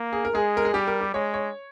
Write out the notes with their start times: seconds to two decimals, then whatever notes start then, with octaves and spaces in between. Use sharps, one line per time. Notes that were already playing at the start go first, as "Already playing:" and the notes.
Already playing: A#3
0.13 G#4
0.25 A#4
0.33 G#3 G#4
0.57 A#4
0.65 G#4
0.74 G3 G4
0.87 A#4
1.01 G4
1.14 G#3 C#5
1.34 C#5